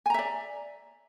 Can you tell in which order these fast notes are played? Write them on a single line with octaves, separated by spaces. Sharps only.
G#5 A#5 E5 D5